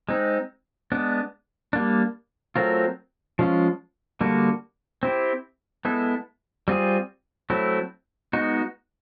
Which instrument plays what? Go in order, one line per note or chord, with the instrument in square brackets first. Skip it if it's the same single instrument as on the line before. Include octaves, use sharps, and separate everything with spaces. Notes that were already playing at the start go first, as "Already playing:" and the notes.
[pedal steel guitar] G#3 C4 D#4
G#3 B3 D4
G3 A#3 D4
F#3 A3 C4 F4 A#4
F3 G#3 C#4 F4
D3 G3 A#3 D4 F#4
C4 E4 G4 C5
G#3 B3 E4 A4
G3 C4 F4 G#4
F#3 A3 C4 E4
G#3 B3 D#4 F#4